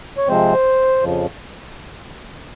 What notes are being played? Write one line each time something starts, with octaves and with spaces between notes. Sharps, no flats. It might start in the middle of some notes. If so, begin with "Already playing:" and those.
C#5
C3 F3 G#3 C4 C5
F2 C#3 F3